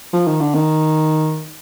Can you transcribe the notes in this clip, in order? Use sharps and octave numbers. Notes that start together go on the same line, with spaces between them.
F3
D#3
D3
D#3